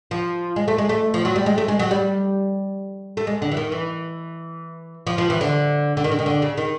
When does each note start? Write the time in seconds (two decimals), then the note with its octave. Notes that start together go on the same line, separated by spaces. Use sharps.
0.11 F3
0.56 G#3
0.68 A3
0.78 G#3
0.89 A3
1.14 F3
1.25 F#3
1.36 G3
1.46 G#3
1.58 A3
1.68 G#3
1.79 F#3
1.91 G3
3.17 A3
3.27 G#3
3.42 D3
3.51 E3
3.57 D#3
3.72 E3
5.07 F3
5.18 F3
5.30 E3
5.41 D3
5.97 D3
6.04 D#3
6.11 D3
6.19 D#3
6.26 D3
6.42 C#3
6.57 D#3